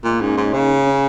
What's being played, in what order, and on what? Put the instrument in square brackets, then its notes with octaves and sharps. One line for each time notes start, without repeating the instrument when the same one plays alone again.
[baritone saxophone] A#2 [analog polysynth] G#3
[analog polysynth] A#3
[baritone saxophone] G#2 [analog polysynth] C#4
[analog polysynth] D#4
[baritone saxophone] G#2
C#3
[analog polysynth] C#4